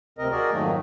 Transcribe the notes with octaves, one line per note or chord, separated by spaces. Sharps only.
D2 C3 C4 A#4 D#5
F#4 G#4 A#4 D5 D#5
F2 G#2 D#3 F#3 A3 A#3